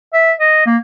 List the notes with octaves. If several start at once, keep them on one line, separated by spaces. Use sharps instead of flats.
E5
D#5
A#3